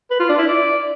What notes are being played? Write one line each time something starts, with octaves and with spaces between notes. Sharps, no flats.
B4
F4
D4
E4
D5